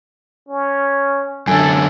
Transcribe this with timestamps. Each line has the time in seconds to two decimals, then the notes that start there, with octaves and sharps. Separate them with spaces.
0.49 C#4
1.48 F#2 D3 A4 G#5